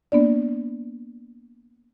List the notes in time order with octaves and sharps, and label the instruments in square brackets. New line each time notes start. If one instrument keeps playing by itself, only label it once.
[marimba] A#3 B3 D4 D5